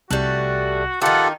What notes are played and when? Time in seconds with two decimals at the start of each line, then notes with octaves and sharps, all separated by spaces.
0.11 C2 G3 A3 F#4 F#6
1.02 D#3 D#4 F4 G4 A4 F#5